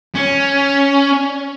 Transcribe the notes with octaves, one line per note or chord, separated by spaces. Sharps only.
C#4